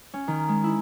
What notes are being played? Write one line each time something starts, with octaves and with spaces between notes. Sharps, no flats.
C#4
D#3
G#3
E4